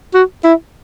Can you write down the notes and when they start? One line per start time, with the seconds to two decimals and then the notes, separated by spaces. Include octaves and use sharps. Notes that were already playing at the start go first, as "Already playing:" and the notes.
0.14 F#4
0.44 E4